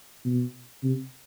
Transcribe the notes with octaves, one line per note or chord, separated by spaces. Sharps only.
B2
C3